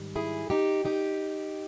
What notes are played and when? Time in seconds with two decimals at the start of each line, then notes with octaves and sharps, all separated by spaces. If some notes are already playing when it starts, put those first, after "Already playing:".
Already playing: G#2 D#3 G3
0.16 E4 G#4
0.50 D#4 G4
0.85 D#4 G4